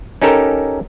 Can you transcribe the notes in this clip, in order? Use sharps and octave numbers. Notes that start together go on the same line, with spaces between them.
C#4 D#4 G4 A4 A#4